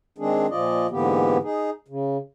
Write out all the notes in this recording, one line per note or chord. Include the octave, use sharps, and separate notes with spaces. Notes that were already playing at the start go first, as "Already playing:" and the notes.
D#3 G#3 C4 D4 G#4
A#2 F3 F4 D5 D#5
G#2 D3 E3 A#3 B3 G4
D#4 G#4
C#3